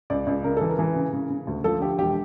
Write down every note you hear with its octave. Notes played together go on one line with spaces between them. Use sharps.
C#2 D5
C#2
C#3 A#4
E3 A4
A#4
E3
C#3
C#3
C#3
D2
F3 A4
D3 G4
E1 G4